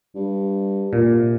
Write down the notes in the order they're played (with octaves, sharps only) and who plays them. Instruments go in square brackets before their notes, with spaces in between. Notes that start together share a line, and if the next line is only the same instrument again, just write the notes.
[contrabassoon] G2
[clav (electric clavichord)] A#2
[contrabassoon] C3